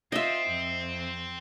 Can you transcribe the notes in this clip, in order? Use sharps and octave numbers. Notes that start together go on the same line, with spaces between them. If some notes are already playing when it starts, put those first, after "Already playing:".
C4 F4 D#5 E5
F2